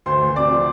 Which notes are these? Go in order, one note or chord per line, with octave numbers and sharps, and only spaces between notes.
D2 C5 C6
D2
C3 D5 D6
F3